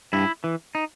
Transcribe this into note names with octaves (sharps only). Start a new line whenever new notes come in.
G2 E4
E3
D#4